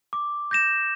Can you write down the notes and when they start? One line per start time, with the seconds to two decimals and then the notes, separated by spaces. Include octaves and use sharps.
0.13 D6
0.51 G6 A#6 E7